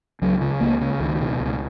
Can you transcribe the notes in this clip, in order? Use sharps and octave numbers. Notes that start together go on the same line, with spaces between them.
C#2 F#3
C#3
C#2 A#3
C#3
C#2 D#3
B2
C#2